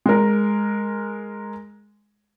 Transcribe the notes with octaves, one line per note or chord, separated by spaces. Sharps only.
G#3 A#4